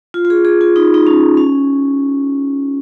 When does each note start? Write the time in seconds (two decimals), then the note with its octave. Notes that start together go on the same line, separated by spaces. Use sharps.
0.14 F4
0.25 F4
0.30 G#4
0.45 G#4
0.61 F4
0.76 D#4
0.94 D#4
1.07 C#4
1.37 C#4